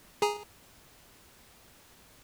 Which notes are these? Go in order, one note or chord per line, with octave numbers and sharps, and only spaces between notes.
G#4 G#5 A#5